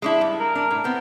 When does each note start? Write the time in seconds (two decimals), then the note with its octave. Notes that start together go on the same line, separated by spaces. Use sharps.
0.02 G#3 D4 E4
0.21 G2
0.40 A#4
0.55 D4
0.71 A2
0.84 B3 C4